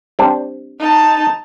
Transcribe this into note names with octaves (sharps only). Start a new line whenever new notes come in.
G3 C4 D4
D#4 A5